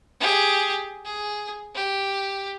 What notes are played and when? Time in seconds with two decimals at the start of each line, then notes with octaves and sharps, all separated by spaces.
0.20 G4 G#4
1.05 G#4
1.75 G4